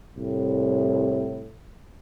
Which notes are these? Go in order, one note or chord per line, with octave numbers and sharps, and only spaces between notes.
C2 A2